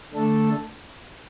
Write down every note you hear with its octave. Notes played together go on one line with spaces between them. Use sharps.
D3 A3 D4 A4